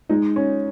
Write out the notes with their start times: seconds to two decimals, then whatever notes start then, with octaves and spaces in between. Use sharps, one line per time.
0.09 G#3 D#4
0.36 C#4